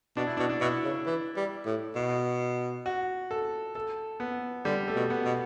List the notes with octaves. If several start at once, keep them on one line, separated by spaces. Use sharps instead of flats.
B2 D4
E4
B2 D4
D4
B2 E4
C#3
E3
G3
A2
B2
F#4
A4
A4
B3
D3 G3
A3
B2
B3
B2